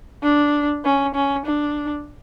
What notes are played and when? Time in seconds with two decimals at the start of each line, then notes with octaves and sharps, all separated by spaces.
0.23 D4
0.85 C#4
1.15 C#4
1.45 D4